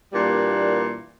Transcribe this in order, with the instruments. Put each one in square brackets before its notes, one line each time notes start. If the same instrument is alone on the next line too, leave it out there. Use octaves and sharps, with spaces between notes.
[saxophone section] A#2 E3 G3 A#3 D4